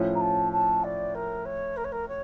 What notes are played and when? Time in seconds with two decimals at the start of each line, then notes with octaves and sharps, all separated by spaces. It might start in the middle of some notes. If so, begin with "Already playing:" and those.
Already playing: A2 F3 C#4
0.15 A#5
0.21 A5
0.52 A5
0.84 D5
1.15 A#4
1.45 C#5
1.77 A#4
1.84 C#5
1.92 A#4
2.08 C#5